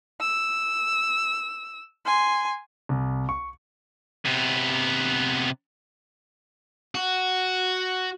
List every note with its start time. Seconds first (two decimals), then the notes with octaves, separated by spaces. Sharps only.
0.21 E6
2.06 G#5 C6
2.89 C2
3.29 C#6
4.26 C3 B3
6.95 F#4